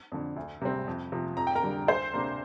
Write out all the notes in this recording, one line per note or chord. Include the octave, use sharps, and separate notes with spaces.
F2 D3
D2
C3 G3 C4
F2
C3 F3
F2 A#5
G5
A#4 A#5
D3 G3
D2 C5 C6
C3 A#3 D4